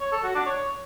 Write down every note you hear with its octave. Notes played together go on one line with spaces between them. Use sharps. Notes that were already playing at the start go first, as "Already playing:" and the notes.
C#5
A4
F#4
D4
C#5